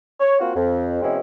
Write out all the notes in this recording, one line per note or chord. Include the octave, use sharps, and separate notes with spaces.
C#5
A#3 C4 F4 F#4
F2
B2 E3 G#3 C4 C#4 E4